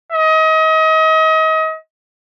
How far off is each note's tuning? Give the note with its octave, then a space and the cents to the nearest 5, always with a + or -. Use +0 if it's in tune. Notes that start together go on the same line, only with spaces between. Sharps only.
D#5 +35